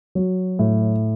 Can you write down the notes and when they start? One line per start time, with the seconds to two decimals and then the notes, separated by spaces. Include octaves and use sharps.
0.15 F#3
0.59 A2